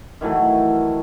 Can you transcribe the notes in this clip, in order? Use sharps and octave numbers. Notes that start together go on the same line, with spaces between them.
D#3 E3 F#3 A3